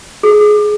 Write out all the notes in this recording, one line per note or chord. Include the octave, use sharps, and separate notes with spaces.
G#4